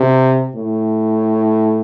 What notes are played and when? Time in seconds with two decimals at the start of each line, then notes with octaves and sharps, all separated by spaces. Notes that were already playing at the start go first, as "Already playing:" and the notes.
Already playing: C3
0.55 A2